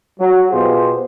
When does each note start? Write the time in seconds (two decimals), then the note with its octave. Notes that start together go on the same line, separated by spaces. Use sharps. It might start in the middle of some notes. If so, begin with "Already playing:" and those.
0.20 F#3
0.51 B2 F4 G4 G#4 C5